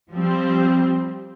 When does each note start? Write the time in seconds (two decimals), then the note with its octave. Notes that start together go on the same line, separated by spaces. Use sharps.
0.11 F3 G3 C4